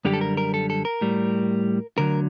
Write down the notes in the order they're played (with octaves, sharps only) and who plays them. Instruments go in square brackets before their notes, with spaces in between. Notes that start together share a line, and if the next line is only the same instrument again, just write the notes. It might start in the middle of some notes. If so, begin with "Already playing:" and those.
[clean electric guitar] F#2 D3 G3 G4
A4
A#4
A#4
A4
A4
A#4
A2 G3
D2 D3 F#3 A#4